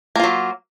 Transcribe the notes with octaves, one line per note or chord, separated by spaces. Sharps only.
F#3 A#3 F4